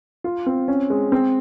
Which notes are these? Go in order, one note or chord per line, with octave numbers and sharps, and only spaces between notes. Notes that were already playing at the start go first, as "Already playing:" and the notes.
F4
C4
C#4
G#3
C4